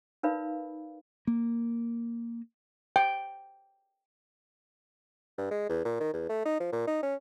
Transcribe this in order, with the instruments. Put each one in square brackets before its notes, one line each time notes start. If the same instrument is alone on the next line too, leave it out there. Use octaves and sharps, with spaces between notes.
[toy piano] D#4 A#4 B4 D5 F5 B5
[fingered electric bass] A#3
[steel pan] G5
[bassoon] G2
G#3
E2
A#2
D#3
E2
A3
D#4
F3
A#2
D#4
C#4